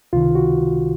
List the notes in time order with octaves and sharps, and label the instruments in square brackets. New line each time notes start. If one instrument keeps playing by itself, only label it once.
[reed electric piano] C#2 C3 D#3 F4
F#4